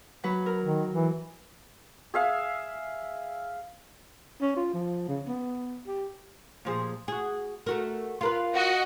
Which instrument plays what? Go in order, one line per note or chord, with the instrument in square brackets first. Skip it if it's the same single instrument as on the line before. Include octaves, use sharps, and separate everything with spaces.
[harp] F#3 B4
A#4
[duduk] D#3
E3
[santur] G#4 E5 F5
[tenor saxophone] C#4
F4
F3
C#3
B3
G4
[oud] A#2 F3 G#4
F#4 G#4
A3 F#4 A#4
F4 A#4 B4
[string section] F#4 D#5